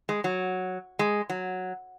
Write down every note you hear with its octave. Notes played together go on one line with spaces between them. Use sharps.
G#3
F#3
G#3
F#3